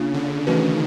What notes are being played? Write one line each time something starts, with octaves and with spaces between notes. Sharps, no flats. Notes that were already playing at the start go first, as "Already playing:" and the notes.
Already playing: C#3 A#3 D4 F4
D3
D#3 E3 A3 C#4 F#4 B4